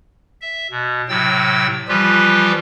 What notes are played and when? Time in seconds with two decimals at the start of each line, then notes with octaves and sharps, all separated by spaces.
0.41 E5
0.71 B2
1.09 A2 C3 F#3 G5 E6 A6
1.88 E3 F3 G3 F4 G4 B4